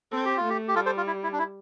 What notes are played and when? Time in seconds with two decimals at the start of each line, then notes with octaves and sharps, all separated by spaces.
0.12 C4 A4
0.25 G4
0.37 F4
0.44 A3
0.50 G4
0.68 G4
0.75 G3 F4 A4
0.86 A4 C5
0.97 F4
1.07 E4
1.23 E4
1.33 D4
1.39 E4